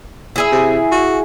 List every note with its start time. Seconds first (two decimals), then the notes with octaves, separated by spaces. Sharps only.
0.36 E4 G#4 E5
0.52 C3
0.92 F#4